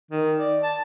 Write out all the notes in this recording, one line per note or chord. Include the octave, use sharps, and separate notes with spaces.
D#3
D5
A5